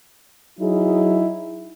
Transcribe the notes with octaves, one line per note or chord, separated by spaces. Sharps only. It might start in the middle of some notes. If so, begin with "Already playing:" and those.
F#3 D#4 E4 G#4